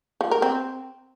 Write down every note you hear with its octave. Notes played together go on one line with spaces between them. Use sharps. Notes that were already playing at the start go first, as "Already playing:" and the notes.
F3
A#4
C4